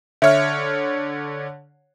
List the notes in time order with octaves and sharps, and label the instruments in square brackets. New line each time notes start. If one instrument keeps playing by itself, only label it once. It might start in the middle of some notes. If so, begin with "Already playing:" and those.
[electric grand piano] D3 C#5 F6 [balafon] E5